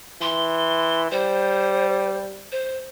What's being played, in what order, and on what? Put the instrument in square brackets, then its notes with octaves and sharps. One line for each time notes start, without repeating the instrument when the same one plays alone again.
[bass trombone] E3 [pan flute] C6
[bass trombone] G3 [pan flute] C5
[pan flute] C5